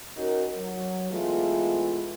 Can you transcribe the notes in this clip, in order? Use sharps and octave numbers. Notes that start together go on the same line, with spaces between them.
C#4 D#4 F#4 A#4
F#3
E3 G#3 A3 B3 F4